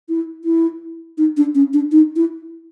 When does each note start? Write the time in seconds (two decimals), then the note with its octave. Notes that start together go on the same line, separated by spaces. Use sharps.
0.09 E4
0.45 E4
1.18 D#4
1.37 D4
1.55 C#4
1.73 D4
1.92 D#4
2.16 E4